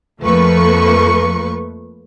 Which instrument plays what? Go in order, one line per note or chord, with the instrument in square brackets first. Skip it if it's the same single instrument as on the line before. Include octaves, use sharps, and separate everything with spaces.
[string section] F2 F3 A3 A#3 B4 C#6